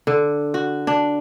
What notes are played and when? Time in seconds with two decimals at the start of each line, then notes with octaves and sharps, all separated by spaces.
0.07 D3
0.54 F#4
0.87 D4